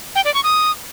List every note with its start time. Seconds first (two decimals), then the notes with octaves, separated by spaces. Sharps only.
0.15 G5
0.25 D5
0.34 C#6
0.44 D#6